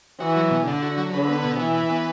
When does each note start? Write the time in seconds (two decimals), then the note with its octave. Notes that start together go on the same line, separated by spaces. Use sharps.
0.20 E3 F#4
0.36 F#3
0.51 B2
0.66 D3 D4
0.82 F#4
0.98 F#3
1.13 D3 B4
1.28 B3
1.44 B2
1.59 E3 E4
1.75 B4
1.90 B3